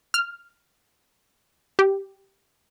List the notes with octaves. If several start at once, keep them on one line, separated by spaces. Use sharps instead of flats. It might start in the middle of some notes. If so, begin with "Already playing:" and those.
F6
G4